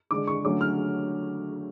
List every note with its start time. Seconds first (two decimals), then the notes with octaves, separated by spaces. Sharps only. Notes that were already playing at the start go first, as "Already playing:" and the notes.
0.11 D3 G#3 D4 D6
0.27 C#6
0.45 D3 F#3 A3 C#4 D6
0.61 F6